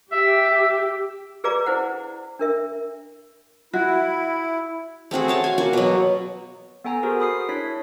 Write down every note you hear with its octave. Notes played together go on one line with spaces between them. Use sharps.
G4 E5
G#4 B4 D5 F5 A#5 D6
E4 C5 F#5
D4 A#4 E5
E4 F#4
A3 C4 F#4 G#4
G#4 C#5 A5
F5 G#5
A#3 F#4 C#6
B2 F#3
B3 A4 G5 G#5 A#5
F#4 G#4 A#4 C5
B5 D#6 C7
D4 E4 C#5 B6